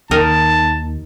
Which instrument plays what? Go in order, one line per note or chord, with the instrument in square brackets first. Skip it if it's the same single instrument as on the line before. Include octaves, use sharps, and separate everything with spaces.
[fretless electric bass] D#2 [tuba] D#3 [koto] D#4 A#4 [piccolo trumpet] A5